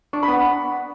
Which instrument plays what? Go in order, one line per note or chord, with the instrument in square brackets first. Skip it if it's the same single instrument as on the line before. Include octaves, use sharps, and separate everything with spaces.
[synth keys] D4 [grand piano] C#6
[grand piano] B5
[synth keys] B3 [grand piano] F#5